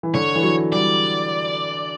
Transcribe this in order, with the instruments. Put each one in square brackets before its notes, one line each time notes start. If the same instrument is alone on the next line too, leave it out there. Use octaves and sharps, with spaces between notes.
[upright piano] E3
[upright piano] D3 [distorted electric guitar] C#5
[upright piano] E3
F#3
[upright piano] G3 [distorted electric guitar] D5